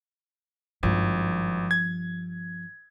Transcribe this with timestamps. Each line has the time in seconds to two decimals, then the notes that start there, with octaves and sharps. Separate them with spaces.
0.83 G#1 G2 F3
1.71 G#6